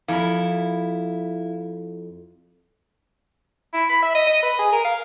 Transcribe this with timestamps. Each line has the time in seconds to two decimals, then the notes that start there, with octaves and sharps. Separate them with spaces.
0.08 F2 E4 A#4 F5 B5
3.74 E4
3.89 B5
4.02 E5
4.15 D#5
4.27 D#5
4.42 B4
4.59 G#4
4.72 A#4
4.84 F5